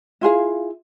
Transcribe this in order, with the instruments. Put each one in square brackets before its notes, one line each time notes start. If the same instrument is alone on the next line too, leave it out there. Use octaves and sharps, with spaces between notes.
[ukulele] E4 F4 G#4 F5